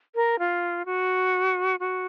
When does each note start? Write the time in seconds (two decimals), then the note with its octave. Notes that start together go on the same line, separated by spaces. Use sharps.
0.15 A#4
0.39 F4
0.85 F#4
1.80 F#4